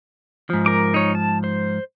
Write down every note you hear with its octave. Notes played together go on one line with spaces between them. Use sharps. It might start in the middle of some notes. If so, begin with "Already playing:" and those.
G#2 F3
A#4 D6
D#4 C#5
A5
C5